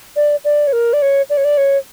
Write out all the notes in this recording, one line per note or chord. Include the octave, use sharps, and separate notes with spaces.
D5
D5
C#5
A#4
D5
C#5
D5
C#5
D5
C#5